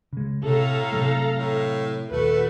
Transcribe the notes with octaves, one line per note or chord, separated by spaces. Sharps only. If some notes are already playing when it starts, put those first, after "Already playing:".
C#3 G#3
A2 C3 A4 F5 A#5
C3 F#3 A3
A2
D#1 A3 F#4 A4 B4